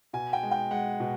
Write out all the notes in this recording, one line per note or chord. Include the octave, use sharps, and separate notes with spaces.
B2 G#5
G5
G#3
G5
G#3 F#5
B2